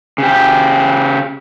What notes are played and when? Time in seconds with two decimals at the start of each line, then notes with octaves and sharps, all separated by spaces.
0.18 C#3 G4